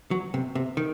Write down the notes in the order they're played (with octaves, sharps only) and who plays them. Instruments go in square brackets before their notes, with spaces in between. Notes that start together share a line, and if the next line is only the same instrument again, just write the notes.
[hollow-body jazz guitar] F#3
C3
C3
D#3